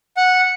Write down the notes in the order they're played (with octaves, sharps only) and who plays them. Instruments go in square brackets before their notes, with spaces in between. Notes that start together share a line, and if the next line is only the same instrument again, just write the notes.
[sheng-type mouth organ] F#5